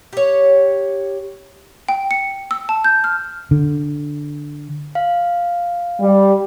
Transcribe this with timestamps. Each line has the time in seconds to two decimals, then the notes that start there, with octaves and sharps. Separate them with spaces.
0.13 G4 C#5
1.89 G5
2.11 C#7
2.51 E6
2.69 A5
2.84 G6
3.04 F6
3.51 D3
4.95 F5
6.00 G3